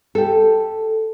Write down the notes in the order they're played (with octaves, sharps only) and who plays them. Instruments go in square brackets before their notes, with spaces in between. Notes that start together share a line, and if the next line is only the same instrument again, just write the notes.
[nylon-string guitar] G4 A4